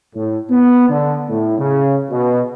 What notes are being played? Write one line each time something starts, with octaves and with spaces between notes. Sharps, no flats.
A2
B3
D3
A2
C#3
B2